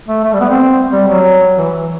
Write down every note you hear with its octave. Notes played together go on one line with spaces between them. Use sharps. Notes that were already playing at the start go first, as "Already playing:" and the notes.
A3
A3
G3
B3
C4
G3
F#3
E3